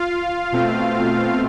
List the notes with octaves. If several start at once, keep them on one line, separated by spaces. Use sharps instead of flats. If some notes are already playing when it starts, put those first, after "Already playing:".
Already playing: F4 F5
B2 A3 C4